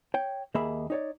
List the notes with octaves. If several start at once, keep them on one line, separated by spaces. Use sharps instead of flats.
C#5 G5
D#2 A#3 G#4 D#5 E5 B5
D#4 C#5 D5